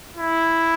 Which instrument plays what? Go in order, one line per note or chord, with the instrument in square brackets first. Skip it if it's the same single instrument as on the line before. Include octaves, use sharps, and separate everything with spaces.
[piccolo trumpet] E4